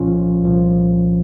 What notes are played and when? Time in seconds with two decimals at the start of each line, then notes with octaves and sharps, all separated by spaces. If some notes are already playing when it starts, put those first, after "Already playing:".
Already playing: C2 A#2 F3 C#4 F4
0.43 C2 A#2 F3